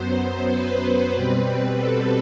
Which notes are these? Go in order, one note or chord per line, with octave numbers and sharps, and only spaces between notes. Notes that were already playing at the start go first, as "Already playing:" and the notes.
Already playing: F#2 F#3 B3 C5
B4
B2 G3 C4
A4